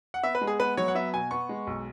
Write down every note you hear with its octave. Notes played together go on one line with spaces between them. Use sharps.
F#5
B3 E5
B4
G#3
G#4
B3 B4
F#3 C#5
F#5
B3 E5
B2 G#5
B3 C#6
G#3
B1